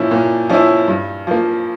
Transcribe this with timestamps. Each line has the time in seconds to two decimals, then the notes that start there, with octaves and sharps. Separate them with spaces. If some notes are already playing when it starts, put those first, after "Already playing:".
Already playing: A#2 F3 C#4 E4
0.11 A#2
0.50 F3 C#4 E4
0.88 G2
1.27 F3 A#3